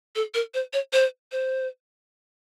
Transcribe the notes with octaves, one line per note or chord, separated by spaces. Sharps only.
A4
A#4
C5
C#5
C5
C5